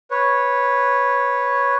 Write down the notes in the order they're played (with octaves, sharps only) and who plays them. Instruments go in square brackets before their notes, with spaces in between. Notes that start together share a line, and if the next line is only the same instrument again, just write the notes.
[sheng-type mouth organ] B4 C#5